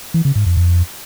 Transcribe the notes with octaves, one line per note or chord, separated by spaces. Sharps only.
E3
C#3
G#2
F2
F2